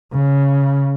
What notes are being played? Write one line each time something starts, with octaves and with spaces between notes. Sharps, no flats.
C#3